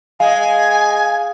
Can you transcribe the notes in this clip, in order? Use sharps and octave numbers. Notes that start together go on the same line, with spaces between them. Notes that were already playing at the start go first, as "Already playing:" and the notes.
G#3 F5 G#5